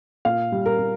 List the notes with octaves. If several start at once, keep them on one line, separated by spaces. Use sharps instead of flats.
A#2 F5
G3
A#4
G3